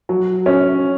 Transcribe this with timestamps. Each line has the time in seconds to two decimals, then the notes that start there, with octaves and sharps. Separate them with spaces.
0.09 F#3
0.46 C#4